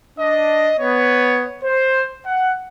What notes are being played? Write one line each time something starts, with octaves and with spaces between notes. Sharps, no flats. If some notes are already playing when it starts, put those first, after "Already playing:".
D4 D#5
B3 C#5
C5
F#5